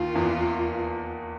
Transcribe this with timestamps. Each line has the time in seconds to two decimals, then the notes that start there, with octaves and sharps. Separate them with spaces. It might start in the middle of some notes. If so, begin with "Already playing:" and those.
Already playing: D#2 D#3 F4
0.15 E2 E3